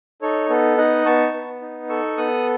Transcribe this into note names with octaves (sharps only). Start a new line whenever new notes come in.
D#4 A4 C#5
B3 A4
D#4 D#5 F#5
B3 A5 C#6
B3
D#4
A4 C#6 E6
B3 D#6 F#6